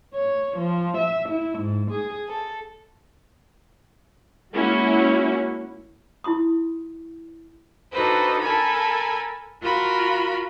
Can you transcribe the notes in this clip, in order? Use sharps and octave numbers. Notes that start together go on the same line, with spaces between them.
C#5
F3
E5
E4
G#2
G#4
A4
G#3 A#3 C#4 E4 F#4
E4 F4 C6 D#6
D4 D#4 F#4 A4 B4 C5
A4 A#4 G#5 A5 B5
F4 F#4 A#4 B5